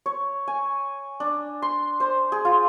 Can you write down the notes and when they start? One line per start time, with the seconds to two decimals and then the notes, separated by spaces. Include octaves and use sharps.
0.06 C#5
0.48 G#5
1.20 D4
1.62 C6
2.00 C5
2.32 G#4
2.45 F4